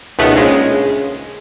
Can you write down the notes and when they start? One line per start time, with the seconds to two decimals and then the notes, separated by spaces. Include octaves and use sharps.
0.19 C#2 B2 D#3 A3 B3
0.34 A#1 C#3 G#3